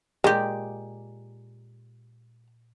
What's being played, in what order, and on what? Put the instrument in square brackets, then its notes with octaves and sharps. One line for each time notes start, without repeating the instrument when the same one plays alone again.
[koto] A#2 G4 [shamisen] G#3